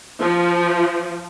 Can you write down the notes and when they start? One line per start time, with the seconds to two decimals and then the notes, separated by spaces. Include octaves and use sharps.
0.20 F3